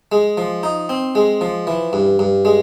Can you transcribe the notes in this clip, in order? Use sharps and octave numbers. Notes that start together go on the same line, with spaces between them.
G#3
F3
D#4
C4
G#3
F3
E3
G2
G2
G#3